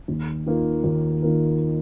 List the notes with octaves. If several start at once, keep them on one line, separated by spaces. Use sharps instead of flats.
D#2
D#3 A#3 F4 A#4
D#2
D#3 A#3 F4 A#4